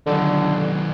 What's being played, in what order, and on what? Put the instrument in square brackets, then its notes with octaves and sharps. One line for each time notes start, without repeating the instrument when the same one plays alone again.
[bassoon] D3 [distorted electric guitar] D#3 F#3